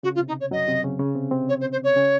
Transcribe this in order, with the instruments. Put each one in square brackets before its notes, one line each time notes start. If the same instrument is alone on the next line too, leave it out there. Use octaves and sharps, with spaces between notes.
[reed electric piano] C#3 [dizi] F#4
[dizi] F4
[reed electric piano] C3
[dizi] D#4
C#5
[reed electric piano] F#2 F#3 [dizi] D#5
[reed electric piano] C3 C4
C#3 C#4
C#3 C#4
C3 C4
C3 C4
[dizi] C#5
C5
C5
C#5
[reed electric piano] C#3 C#4